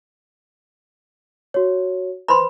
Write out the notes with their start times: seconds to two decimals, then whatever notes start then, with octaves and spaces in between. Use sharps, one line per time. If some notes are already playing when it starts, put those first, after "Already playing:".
1.54 F#4 C#5
2.28 B4 C5 B5 C6